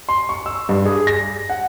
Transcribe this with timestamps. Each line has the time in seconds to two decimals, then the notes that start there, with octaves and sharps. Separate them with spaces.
0.09 C6
0.29 C#6
0.46 E6
0.69 G2
0.85 G#4
1.07 A#6
1.50 F#5